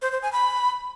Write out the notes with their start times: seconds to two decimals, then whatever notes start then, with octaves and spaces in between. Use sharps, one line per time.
0.02 C5
0.12 C5
0.22 G#5
0.32 B5